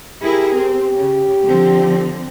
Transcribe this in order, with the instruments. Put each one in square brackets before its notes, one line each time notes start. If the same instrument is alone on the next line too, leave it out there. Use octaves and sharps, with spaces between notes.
[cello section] E4 G#4 A#4 [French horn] G4
[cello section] C4
C#3
D3 F3 C4